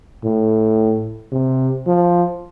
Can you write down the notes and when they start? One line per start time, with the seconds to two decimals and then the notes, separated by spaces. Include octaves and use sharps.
0.23 A2
1.32 C3
1.87 F3